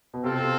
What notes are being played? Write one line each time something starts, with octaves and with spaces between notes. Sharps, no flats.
B2
C3 C4 F4 A4